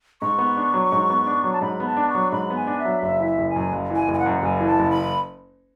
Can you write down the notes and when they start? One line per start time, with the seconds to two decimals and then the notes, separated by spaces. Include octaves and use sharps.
0.21 G#2 C#6
0.39 B3
0.57 D4
0.74 F#3
0.92 G#2
1.10 B3
1.26 D4
1.44 F#3
1.53 A5
1.61 G#2 B5
1.80 B3
1.86 A5
1.97 D4
2.09 C#6
2.15 F#3
2.32 G#2 B5
2.50 B3
2.56 G#5
2.67 D4
2.79 E5
2.85 F#3
3.03 F#1 E5
3.20 E3
3.26 E5
3.38 F#1
3.50 G#5
3.56 F#2
3.72 F#1
3.90 E3
3.96 G#5
4.08 F#1
4.14 G#5
4.19 F#5
4.26 F#2
4.43 F#1 G#5
4.61 E3
4.67 A5
4.79 F#1
4.91 B5